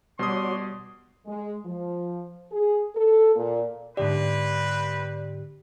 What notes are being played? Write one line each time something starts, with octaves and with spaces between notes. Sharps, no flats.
B2 G3 F#4 C#5 D5 C6 D#6
G#3
F3
G#4
A4
A#2
G#2 D3 C4 G4 B4 D5